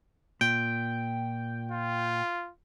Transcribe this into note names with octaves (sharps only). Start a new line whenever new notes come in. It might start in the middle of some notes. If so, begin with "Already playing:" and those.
A#2 G5
F4